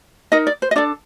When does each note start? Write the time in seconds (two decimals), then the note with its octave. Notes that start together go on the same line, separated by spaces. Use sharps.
0.32 D#4 A#4 D#5
0.47 D5
0.62 C5
0.71 D#5
0.76 D4 A4 D5